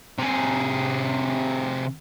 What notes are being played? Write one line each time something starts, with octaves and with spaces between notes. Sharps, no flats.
C3 G#4